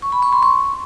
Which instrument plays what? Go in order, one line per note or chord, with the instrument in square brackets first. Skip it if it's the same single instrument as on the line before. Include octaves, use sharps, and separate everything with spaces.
[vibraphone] C#6
B5
C#6
C6
C#6